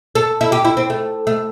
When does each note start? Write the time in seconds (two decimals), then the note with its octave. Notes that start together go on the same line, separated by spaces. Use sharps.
0.15 A4
0.41 E4
0.52 G4
0.65 E4
0.77 C4
0.90 A3
1.27 A3